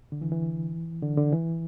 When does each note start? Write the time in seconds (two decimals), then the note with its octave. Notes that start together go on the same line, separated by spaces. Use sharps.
0.12 D3
0.21 E3
0.32 E3
1.03 D3
1.17 D3
1.32 E3